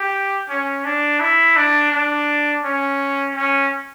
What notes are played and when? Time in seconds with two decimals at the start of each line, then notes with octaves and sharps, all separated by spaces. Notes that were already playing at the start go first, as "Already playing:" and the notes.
Already playing: G4
0.49 C#4
0.85 D4
1.20 E4
1.56 D4
1.92 D4
2.64 C#4
3.35 C#4